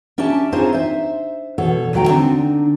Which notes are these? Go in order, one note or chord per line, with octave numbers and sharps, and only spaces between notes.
C#4 D4 G4 E5 A5
C4 D#4 F4 G#4 C5 C#5
C5 E5
B2 E3 A4 C#5 F#5
D#2 D#3 F#3 A3 G5 A#5
D3 C4 D4 D#4